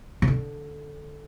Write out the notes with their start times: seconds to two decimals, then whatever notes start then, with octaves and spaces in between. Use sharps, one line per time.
0.22 C3
0.28 D3